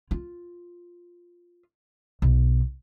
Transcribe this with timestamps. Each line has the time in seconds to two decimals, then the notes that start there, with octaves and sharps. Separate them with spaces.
0.11 F4
2.22 B1